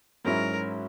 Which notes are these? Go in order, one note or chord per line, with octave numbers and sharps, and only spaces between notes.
G#2 F#3 C#4 E4 A#4